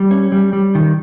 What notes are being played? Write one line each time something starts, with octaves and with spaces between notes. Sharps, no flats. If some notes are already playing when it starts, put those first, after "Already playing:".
Already playing: G3
C#4
G3
G3
D#3